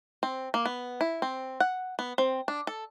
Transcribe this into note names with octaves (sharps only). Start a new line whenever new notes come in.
C4
A#3
B3
E4
C4
F#5
B3
C4
D4
A4